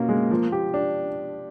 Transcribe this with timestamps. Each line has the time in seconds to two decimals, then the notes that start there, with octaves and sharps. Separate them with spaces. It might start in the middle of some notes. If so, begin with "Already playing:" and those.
Already playing: B2 A#3 C#4 F4
0.09 G#3
0.31 F3
0.52 G4
0.74 D4